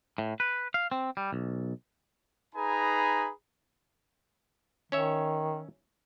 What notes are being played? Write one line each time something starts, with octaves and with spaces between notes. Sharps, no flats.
A2
B4
F5
C4
G3
B1
D#4 G#4 B4 G#5 A#5 B5
D#3 C#4 C#5 E5